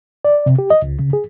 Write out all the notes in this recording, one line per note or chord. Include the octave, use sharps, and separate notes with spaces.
D5
C3
G4
D#5
C#2
C#3
G#4